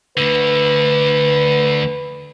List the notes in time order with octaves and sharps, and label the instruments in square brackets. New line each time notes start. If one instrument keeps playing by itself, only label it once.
[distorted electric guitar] D2 D3 [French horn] B4